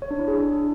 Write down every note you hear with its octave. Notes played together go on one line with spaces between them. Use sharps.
C#5
D4
E4
G#4
D4